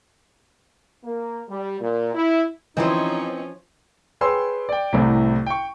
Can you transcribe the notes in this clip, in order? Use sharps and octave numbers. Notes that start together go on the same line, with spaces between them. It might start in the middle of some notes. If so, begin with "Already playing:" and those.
A#3
G3
A#2
E4
E3 F3 C4 C#4 D#4 E4 C5 D#5
G#4 B4 C#5 G5 C6 E6
D5 G5
C2 A2 C3
G5 C#6